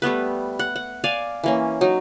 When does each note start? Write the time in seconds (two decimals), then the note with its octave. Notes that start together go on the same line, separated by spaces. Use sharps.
0.02 G3 A3 B3 B4
0.59 F#5
0.76 F#5
1.04 D5 F5 G#5
1.44 E3 A#3 C#4
1.81 F#3 D#4